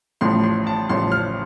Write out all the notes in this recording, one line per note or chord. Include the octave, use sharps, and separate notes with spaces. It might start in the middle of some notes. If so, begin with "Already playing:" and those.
A1 A2 F3 C6
C6
A5
A1 A2 F3 C6
F6